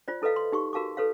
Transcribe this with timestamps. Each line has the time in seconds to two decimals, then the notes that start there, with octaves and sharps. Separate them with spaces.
0.08 F4 C5 D5
0.22 E4 A4 B4 D#5 F5
0.36 C6
0.52 D#4 G4 C#6
0.73 F#4 A#4 F5 A5 C#6 D6
0.97 A4 B4 C#5 F5